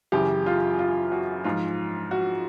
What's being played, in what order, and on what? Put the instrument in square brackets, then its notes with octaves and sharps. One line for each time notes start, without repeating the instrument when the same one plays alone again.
[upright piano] F#2 C#3 E3 G4
F4
F4
F#4
G#2 F3 F4
F#4